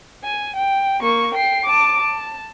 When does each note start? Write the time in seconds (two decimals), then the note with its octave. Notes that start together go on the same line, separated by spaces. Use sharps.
0.24 G#5
0.56 G5
1.01 A#3 C#6
1.35 G5 C7
1.66 A5 D6
2.01 A5